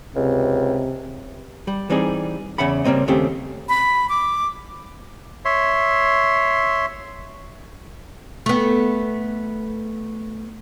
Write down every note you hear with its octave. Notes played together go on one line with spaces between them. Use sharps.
C#2 C3
G3
E3 G3 C4 D#4 G#4
E2 C#3 E5 F#5 B5
C#3 G3 A#3 C4 D#5
D#2 C#3 A3 C4 G4
B5
D6
C#5 E5 C6
A3 B3